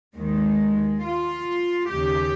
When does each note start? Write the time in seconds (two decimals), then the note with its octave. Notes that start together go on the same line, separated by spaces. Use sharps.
0.15 D#2 D#3 G#3
1.02 F4
1.89 D#2 C#3 G4